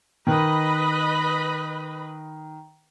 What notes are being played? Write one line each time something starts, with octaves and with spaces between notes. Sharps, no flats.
D#3 B4 D#5 B5